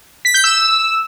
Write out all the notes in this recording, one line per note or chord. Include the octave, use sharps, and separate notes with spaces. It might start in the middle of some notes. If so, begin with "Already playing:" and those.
B6
G6
E6